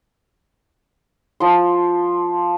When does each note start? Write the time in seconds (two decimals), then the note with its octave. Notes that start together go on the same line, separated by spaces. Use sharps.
1.40 F3 C6